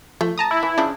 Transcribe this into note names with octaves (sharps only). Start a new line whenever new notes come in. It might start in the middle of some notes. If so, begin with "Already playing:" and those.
F3 A3
A5 A#5 D#6
E4
E3
C#3 F3 D4